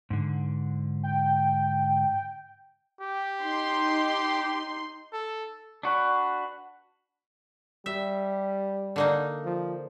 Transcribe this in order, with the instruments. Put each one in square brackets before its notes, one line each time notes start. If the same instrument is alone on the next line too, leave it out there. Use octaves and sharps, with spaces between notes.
[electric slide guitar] G#2 D3
[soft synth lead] G5
[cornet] G4
[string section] D#4 C6
[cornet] A4
[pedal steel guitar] D4 F#4 B4
[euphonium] G3 [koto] E5
[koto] D3 A#3 D#4
[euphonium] F3